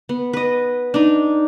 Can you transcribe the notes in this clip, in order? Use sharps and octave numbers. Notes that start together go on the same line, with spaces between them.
B3
B4 D#5
D4 D#4